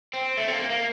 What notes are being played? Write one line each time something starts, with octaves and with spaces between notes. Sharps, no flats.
C4
A3
C4
A#3
A#3